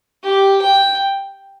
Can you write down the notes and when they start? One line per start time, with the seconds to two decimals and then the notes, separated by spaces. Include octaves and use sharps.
0.24 G4
0.62 G5